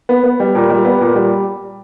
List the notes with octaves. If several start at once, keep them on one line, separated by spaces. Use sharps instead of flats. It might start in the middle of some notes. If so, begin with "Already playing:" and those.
B3
B3
G3
A#2
G3
B3
A#2
G3